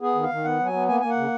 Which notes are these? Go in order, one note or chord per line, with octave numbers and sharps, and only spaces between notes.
B3 G#4
D#3
F5
D#3
B3 F#5
F#3
G#5
B3
A#3 G#5
A#3 G#5
F#5
C#3